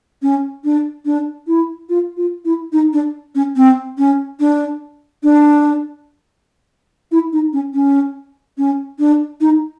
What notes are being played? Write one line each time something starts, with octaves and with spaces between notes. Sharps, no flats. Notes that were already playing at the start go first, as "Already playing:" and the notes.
C#4
D4
D4
E4
F4
F4
E4
D#4
D4
C#4
C4
C#4
D4
D4
E4
D#4
C#4
C#4
C#4
D4
D#4